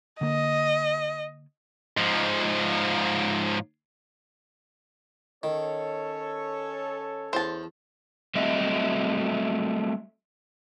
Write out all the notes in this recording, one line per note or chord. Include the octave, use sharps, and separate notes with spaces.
D3 A#3 D#5
G#2 F3
D#3 C#4 A4 C#5
E2 C5 A5
F#3 G3 A3 C4 D#5 E5